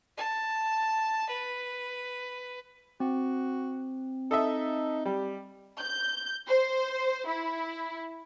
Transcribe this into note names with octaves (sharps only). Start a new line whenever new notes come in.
A5
B4
C4 F#4
D#4 A4 D#5 E5
G3 G4
G6
C5
E4